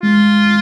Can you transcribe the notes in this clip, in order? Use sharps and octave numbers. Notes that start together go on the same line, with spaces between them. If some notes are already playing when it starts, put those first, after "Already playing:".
G#3 F4